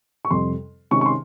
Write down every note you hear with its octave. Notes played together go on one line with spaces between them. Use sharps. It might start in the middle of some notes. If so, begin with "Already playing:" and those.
C#6
F2 C3 G3 C6
C3 D#3 G#3 C#4 C#6
C#6
C6